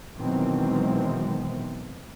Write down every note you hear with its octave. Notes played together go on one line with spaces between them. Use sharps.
B2 D#3 E3 F#3 G#3 C4